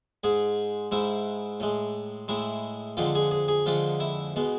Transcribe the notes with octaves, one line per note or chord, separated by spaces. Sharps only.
G#2 G#3 G#4
G#2 G#3 E4
A2 G#3
A2 G#3 E4
F2 D3 G#3 F4
G#4
G#4
G#4
F2 D3 G#3 F4
E4
B2 G#3